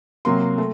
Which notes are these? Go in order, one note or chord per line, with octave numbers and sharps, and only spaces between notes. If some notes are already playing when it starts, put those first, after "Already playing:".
C3 F#3 A#3 C6
A3